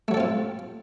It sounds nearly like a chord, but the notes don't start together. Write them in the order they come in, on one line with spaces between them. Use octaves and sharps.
A3 F#3 A4 C4 F4